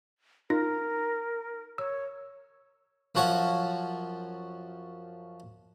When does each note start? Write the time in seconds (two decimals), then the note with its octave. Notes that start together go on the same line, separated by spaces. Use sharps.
0.50 D#4 F4 A#4 A#6
1.78 C#5 E6
3.15 F#2 F3 F#4 C#5 F#5